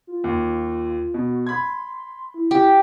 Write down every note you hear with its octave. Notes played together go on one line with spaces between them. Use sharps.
F4
D#2
B2 F#4
B5 C6 G#6
E4
G4